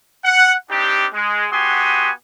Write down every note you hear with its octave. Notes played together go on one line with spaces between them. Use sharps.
F#5
C4 D4 D#4 G4
G#3
B3 F#4 G4 G#5 C6 D#6